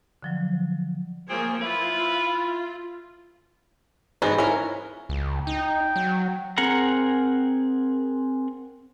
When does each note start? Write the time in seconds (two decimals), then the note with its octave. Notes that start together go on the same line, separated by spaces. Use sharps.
0.22 D3 F3 F#3
1.29 F3 A#3 C4 G#4 C#5
1.61 E4 F4 B4
4.22 G#2 G#3 B3 F#4
4.38 C#4 E4 A#4
5.09 C#2
5.47 D#4 G5
5.96 F#3
6.58 C4 G#4 A#4 F#5 A#5